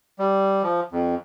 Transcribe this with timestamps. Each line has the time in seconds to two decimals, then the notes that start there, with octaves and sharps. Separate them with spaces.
0.19 G3
0.63 F3
0.92 F2